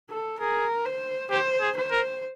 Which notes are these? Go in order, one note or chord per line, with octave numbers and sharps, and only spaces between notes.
A4
G#4 A#4
C5
G4 C5
G#4
C5
A#4